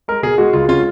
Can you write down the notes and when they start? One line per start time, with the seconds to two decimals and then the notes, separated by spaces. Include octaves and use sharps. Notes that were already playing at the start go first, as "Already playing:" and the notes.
0.08 G#3 A#4
0.23 B2 G#4
0.38 G#3 F#4
0.53 C#2 F4
0.68 C#4 F4